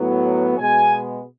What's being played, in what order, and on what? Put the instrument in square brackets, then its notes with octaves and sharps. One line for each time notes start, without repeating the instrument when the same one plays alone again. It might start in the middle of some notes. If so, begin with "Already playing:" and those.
Already playing: [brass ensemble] A2 F#3 B3
B2 G#3 B3 G#5